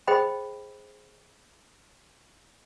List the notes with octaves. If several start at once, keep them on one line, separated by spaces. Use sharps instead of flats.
G#4 C5 D#5 G5 B5